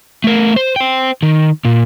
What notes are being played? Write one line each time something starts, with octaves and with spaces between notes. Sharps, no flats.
A3 A#4
C5
C5 G5
D#3
A#2